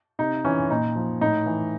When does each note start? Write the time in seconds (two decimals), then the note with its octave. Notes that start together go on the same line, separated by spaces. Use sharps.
0.19 C3 D#4
0.45 E3 C#4
0.70 A#2 D#4
0.96 F3
1.21 A2 D#4
1.46 E3